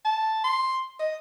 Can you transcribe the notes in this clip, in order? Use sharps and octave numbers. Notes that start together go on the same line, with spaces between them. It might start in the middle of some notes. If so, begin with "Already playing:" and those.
A5
C6
D#5